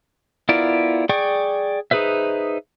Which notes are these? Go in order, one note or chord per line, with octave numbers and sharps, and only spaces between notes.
B3 E4 F4 A#4 D5
G#4 D5 G5 C#6
D#4 G#4 B4 C5 E5